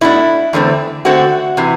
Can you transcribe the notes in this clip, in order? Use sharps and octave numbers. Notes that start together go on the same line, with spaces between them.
B2 A3 D4 E4
E2 D3 A3 C4
D3 A3 C4 F#4
C3 E3